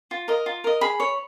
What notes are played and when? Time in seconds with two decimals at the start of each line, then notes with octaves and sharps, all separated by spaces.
0.11 F4
0.28 A#4 D#5
0.46 F4
0.64 A#4 D#5
0.81 G#4 B5
1.00 C#5